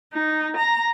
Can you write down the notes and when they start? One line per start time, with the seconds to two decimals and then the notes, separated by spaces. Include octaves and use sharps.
0.13 D#4
0.56 A#5